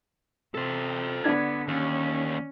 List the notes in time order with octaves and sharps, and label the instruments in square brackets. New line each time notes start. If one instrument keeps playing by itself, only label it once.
[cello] C3 [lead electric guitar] A4 C5
[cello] D3 B3 [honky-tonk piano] D4 G#6
[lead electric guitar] D#2 [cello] C#4